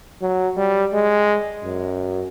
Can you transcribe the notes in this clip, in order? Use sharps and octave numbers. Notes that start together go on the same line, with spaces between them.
F#3
G3
G#3
F#2